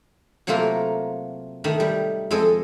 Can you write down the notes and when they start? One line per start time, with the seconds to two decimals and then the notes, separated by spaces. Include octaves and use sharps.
0.47 C3 F#3 A3 A#3 F4 A#4
1.64 D#3 A3
1.80 G3
2.31 F2 G#3 A4 D#5